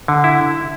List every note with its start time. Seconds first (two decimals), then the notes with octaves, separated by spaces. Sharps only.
0.08 D3
0.24 E4